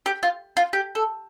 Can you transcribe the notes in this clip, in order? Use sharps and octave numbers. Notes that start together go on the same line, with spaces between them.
G4
F4
F4
G4
A4